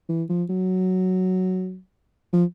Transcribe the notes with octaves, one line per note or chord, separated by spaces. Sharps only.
E3
F3
F#3
F3